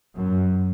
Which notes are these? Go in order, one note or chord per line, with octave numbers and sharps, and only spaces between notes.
F#2